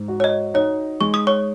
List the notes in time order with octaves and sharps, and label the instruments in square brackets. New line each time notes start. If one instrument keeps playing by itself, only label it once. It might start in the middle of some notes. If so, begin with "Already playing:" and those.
Already playing: [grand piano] G#2
F#4
[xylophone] C#5
D#5
[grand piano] D#4 [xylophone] C#5
[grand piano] G#3 [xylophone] C#6
[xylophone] D#6
C#5 C#6